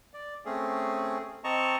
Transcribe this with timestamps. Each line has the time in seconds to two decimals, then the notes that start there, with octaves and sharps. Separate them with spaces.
0.14 D5
0.45 A3 C4 C#4 G#4
1.44 C4 D#5 A5 A#5 C#6